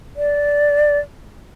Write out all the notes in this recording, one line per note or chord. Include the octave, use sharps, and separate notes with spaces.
D5